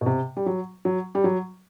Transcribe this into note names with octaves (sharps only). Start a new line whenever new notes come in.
B2
C3
G3
F#3
F#3
G3
F#3